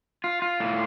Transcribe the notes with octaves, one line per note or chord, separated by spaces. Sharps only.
F4
F4
A2